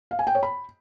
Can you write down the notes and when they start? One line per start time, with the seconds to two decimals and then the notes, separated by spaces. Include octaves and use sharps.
0.11 F5
0.19 G#5
0.27 G5
0.35 C#5
0.43 B5